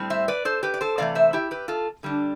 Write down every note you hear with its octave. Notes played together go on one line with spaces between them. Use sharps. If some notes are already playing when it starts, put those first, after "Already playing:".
Already playing: A2 G3 C4
C5 E5
B4 D5
A4 C5
G4 B4
D5
A4 C5
C3 E3 A3 D5 F5
C5 E5
E4 G4
G4 B4
F4 A4
D3 G3 D4